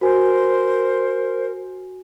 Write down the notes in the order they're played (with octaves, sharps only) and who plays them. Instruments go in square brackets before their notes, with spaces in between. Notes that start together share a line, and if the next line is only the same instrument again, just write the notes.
[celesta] F#4 G#5 [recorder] A#4 [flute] C5